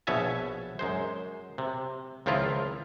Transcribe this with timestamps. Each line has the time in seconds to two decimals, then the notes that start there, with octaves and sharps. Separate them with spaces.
0.07 A#1 B2 C#5 E5 G#5 A5
0.79 F#2 G#3 C5
1.58 C3
2.26 C#2 D#3 F3 C4 E4 F4